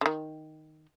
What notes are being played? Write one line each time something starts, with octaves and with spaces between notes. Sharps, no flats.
D3 D#3